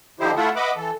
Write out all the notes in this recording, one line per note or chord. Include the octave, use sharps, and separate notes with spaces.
D3 F3 D#4 E4 G4 C5
A3 E4 F4 A4 E5 F#5
B4 D#5 E5 F#5 B5 D6
E3 A4